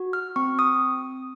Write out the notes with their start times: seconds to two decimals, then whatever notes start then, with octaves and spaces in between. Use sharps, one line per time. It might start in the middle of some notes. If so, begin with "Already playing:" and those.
Already playing: F#4
0.13 F6
0.36 C4 C#6
0.59 D#6